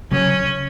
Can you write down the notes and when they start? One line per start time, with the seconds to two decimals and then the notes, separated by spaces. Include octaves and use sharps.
0.12 C#3 F#3 C#4